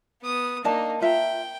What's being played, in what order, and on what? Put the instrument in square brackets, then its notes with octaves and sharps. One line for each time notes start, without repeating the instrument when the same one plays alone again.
[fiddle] B3 D#6
[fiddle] A#3 D#4 [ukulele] D4 D#5 A5
[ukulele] F4 E5 A#5 [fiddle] G5